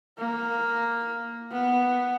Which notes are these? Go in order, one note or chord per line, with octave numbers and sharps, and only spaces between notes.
A#3
B3